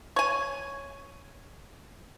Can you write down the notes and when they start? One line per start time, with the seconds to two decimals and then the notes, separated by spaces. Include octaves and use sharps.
0.16 C#5 G#5